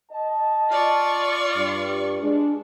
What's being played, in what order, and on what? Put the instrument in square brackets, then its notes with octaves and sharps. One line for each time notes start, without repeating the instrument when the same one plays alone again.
[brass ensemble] D#5 A5
[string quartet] F4 D5 C#6
[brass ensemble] G2
G#3 D4